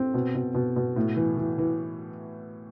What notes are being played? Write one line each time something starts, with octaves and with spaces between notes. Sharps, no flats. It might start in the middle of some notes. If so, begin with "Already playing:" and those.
Already playing: C4
B2
B2
B2
B2
A2
E3
E3
E3